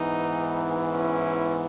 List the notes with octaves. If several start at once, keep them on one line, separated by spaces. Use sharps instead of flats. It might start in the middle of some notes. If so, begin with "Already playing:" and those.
Already playing: G#2 E3 B3 D#4
C#4 E4